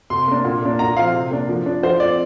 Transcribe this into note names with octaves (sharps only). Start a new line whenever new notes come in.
C3 C6
A#3 D4
A#2
A#3 D4
A#2 A#5
F3 C4 F5
C3
A#3 D4
F3
D4
F3 C5
C4 D5